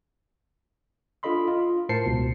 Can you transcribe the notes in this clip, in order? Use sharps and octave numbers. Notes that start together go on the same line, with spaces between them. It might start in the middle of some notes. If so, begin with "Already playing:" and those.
D4 F4 A4 D#5 B5 C6
F4
A2 A#4 C5 A5 C7 C#7
C#2 B2